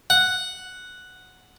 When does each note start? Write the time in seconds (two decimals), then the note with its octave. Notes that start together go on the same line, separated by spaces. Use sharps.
0.10 F#5